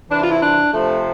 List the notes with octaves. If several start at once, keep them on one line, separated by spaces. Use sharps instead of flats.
C3 E3 D4
F4
E4
D4
C3 F3 A3